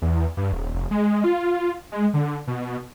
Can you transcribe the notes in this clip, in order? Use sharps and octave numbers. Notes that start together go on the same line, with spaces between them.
E2
G2
D#1
F1
G#3
F4
G#3
D3
B2